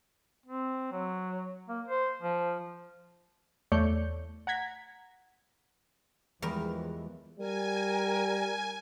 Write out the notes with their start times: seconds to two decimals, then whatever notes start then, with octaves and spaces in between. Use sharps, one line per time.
0.46 C4
0.92 F#3
1.68 A#3
1.88 C5
2.22 F3
3.72 E2 A3 C#5 D5 G6 C#7
4.47 F#5 A#5 G#6 B6
6.42 E2 E3 F3 G3 G#3 A#4
7.39 G3 A#4 G#5